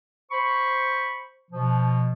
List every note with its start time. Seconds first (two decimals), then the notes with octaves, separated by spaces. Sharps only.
0.31 C5 B5 C#6
1.52 B2 F3